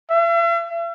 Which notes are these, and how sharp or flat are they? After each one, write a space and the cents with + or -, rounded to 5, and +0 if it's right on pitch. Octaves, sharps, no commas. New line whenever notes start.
E5 +45